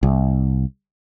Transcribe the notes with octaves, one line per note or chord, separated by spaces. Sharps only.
C2